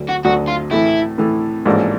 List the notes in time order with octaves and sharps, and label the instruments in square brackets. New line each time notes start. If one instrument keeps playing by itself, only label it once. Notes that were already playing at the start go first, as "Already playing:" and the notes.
Already playing: [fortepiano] D2 D3 F#3
[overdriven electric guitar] F#4
[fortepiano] D2 D3 F#3 [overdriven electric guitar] F#4
[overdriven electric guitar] F4
[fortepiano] A2 E3 A3 [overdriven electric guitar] E4
[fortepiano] A2 E3 A3
A1 G#2 F3 A#3 D4